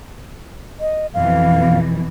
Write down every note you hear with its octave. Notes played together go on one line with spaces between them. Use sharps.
D#5
F2 B2 E3 F5